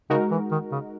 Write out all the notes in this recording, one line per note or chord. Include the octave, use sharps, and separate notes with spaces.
C#3 G#3 D#4 F#4 A#4
E3
D#3
C#3